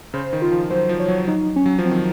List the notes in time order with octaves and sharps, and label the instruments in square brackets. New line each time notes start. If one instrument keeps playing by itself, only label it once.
[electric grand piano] C#3 [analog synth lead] C5
[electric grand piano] D#3
[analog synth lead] F4
[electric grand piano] F3
[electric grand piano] F#3 [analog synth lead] C5
[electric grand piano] F3
[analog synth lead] C#5
[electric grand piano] F#3
[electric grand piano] F#3 [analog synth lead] D#4
[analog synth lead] C#4
[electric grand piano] F#3
F3
[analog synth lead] C4
[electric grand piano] D#3